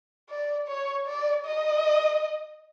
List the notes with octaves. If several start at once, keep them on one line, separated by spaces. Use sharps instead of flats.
D5
C#5
D5
D#5